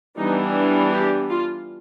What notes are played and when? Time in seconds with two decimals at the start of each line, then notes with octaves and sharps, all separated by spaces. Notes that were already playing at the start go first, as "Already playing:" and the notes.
0.18 E3 G3 B3 D4 D#4
0.93 G4
1.29 F4